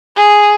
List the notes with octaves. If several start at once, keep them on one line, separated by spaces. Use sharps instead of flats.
G#4